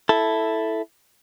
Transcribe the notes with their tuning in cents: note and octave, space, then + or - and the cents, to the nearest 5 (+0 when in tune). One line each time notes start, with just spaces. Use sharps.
E4 +0 A4 +0